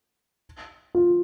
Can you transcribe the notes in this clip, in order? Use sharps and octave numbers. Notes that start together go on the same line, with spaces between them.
F4